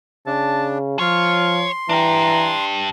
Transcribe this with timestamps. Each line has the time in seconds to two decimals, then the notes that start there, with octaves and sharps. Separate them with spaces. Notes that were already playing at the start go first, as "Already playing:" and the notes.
0.27 C#3 D4 A5
0.99 F3 F4 C#5 C6
1.89 E3 D4 G4 A#5